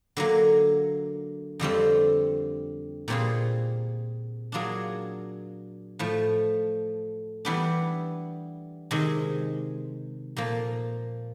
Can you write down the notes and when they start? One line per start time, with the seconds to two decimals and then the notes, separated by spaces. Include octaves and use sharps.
0.17 D3 F#3 A#3
1.59 F2 D3 G3 C4 F4
3.08 A#2 G3 C4 F4 G#4
4.52 F#3 A#3 D4 F4 G#4
5.99 A2 F3 A3
7.45 E3 G3 B3 D4
8.91 C3 D#3 G#3
10.37 A#2 F3 A#3